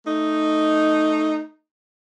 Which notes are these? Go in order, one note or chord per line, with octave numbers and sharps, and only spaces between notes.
A3 D#4